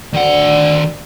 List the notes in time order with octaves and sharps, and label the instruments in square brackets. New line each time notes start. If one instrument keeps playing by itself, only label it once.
[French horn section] D2 D5 [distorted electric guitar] D#3 F#5